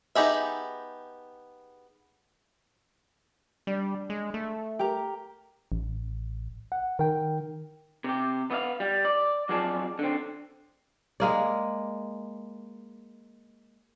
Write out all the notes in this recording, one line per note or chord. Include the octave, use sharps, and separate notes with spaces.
B3 D#4 G4 G#4 E5
G3 D4
G#3
A3
G4 A#4 A#5
A1
F#5
D#3 A#4 G5
C3 G4
B3 D#5 F5
G3
D5
F2 F#3 F4 G#4 D5 A5
D3 C4
G#3 A#3 D5